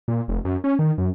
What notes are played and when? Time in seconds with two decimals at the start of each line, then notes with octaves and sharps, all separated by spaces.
0.08 A#2
0.28 F1
0.45 F#2
0.64 C#4
0.79 D#3
0.98 F#2